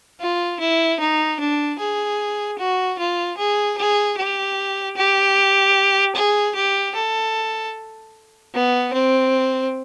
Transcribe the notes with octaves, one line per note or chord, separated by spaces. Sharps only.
F4
E4
D#4
D4
G#4
F#4
F4
G#4
G#4
G4
G4
G#4
G4
A4
B3
C4